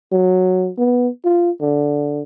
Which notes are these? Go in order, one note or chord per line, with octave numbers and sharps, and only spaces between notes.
F#3
B3
F4
D3